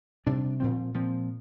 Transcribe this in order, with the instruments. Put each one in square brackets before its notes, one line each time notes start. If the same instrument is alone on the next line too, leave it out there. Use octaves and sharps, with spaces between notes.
[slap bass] C3 G3 D4
A#2 F3 C4
A#2 F3 C4